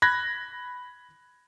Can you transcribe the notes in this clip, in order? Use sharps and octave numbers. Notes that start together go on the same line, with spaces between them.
B5 F#6 G#6 A#6